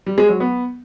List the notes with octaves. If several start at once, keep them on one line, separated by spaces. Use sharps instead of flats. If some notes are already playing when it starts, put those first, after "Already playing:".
G3
G#3
F#3
B3